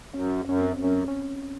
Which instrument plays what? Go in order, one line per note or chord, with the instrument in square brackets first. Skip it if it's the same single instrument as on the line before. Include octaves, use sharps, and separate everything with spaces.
[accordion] F#2 [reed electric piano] C#4
[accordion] F#2 [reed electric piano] C#4
[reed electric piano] C4
[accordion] F#2
[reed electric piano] C#4
C#4